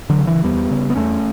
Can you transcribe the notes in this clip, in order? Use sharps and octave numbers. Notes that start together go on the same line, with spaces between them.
D3 F#3
C#3
E3
E2 G3 B3
C#3
B3
E2 A3 C#4